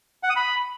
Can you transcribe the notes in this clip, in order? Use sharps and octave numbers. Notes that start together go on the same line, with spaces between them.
F#5
D#6
B5